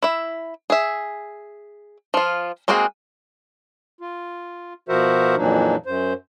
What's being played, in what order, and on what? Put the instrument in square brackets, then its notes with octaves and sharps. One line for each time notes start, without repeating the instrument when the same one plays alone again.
[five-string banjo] E4 E5
G#4 E5
F3 F4
G#3 A#3 C4 F#4 G#4
[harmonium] F4
B2 F3 F#4 A#4 C5 E5
F2 A#2 E3 F#3 D4 D#4
F#2 C5